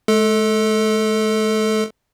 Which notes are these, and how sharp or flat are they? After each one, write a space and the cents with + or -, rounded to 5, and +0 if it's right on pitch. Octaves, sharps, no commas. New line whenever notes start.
G#3 +45 A4 +0